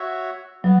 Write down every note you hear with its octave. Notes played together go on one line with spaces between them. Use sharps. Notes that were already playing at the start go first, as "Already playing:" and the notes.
Already playing: F#4 C#5 E5
F#3 B3